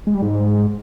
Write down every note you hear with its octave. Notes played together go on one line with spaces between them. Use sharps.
G#3
G3
G#2